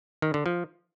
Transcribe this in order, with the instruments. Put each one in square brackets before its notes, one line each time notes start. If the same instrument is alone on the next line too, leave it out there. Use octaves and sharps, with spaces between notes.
[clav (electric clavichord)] D#3
D3
F3